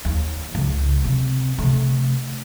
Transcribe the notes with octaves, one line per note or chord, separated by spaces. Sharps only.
D#2
C#2
C3
C3 A3